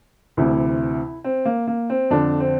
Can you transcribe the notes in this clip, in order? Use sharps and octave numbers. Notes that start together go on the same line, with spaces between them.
D2 C3 E3 E4
C4
A#3
A#3
C4
F2 D3 D4
C4